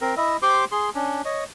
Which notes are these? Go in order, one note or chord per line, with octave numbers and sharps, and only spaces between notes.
C4 A#4
E4 D#5 E5
G4 C5 C6 D6
G#4 C6
C#4 D4
C#5 D#5